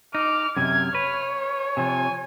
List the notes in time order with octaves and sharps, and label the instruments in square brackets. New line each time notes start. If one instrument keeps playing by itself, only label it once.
[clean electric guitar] D#4 [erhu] D6 [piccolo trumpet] F6
[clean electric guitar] F#2 C3 [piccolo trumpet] F6 [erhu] G#6
[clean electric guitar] B4 [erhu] C#5
[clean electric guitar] C3 F3 [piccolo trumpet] G#5